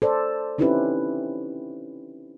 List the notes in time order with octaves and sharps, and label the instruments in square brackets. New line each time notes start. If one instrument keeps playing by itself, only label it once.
[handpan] A4 C5 D5
C4 C#4 D#4 E4 G4 B4